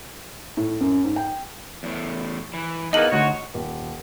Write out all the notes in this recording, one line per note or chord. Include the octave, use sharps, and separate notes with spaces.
A2
F#2
G#2
G5
E2 A2
E3
E2 A#3 B3 D#4 D#5 F#7
D2 D#4 F#4 C#5
D#1